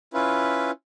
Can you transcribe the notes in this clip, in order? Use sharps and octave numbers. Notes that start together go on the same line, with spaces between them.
C#4 E4 F4 B4